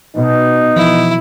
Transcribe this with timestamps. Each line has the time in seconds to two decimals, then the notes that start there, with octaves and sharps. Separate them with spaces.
0.16 B2 D#4
0.76 E3 F3 E4